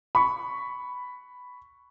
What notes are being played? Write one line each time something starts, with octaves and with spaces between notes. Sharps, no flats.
B5 C#6